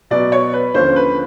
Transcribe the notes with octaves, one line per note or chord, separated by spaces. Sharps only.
B2 F#3 B3 D5
C#5
B4
D#2 D3 F3 A#3 C#4 C5
B4